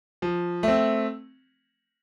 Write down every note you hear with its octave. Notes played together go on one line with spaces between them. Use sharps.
F3
A3 C4